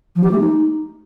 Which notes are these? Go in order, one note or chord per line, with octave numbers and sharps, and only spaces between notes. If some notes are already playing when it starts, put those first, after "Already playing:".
F3
G4
A3
D#4